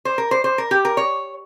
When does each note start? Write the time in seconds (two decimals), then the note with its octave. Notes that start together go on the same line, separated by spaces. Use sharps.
0.05 C5
0.18 A#4
0.31 C5
0.44 C5
0.58 A#4
0.71 G4
0.85 A#4
0.97 C#5